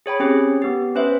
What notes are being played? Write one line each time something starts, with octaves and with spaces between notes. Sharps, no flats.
G#4 C#5 G5 B5
C4 C#4 G4 G#4 C#5
B3 G4
C#4 B4 C5 E5